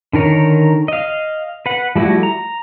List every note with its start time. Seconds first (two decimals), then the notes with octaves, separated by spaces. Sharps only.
0.13 D3 D#3 A#4 C#5
0.88 D#5 F5
1.66 B4 F#5
1.95 F3 G3 A3 E4 F#4
2.23 A#5